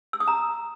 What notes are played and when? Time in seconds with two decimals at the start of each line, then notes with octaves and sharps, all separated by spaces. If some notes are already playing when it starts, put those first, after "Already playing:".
0.13 E6
0.20 D#6
0.27 A#5